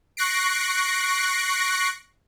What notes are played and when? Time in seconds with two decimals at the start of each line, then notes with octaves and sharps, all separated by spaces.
0.17 C#6 F#6 A#6 C7 D7